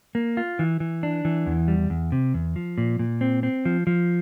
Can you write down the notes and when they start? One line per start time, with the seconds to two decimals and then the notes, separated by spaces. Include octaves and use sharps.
0.15 A#3
0.37 F4
0.59 E3
0.80 E3
1.03 D4
1.25 E3
1.46 E2
1.68 G3
1.90 E2
2.12 C3
2.34 E2
2.56 F3
2.78 A#2
2.99 A#2
3.21 C4
3.43 C4
3.65 F3
3.87 F3